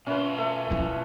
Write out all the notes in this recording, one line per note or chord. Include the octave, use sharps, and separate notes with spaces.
B2 C#4 F4 B4 E5
A3 E5
C#4 E4